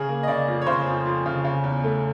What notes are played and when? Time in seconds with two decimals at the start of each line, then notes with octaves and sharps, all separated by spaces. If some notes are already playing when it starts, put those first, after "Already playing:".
Already playing: C#3 G#4
0.09 A#3
0.23 D#5
0.27 C#3 D5
0.48 F2
0.62 C#5
0.67 C#3 C5
0.87 F2
1.05 F2
1.26 C#3
1.45 C#3
1.64 E2
1.84 A3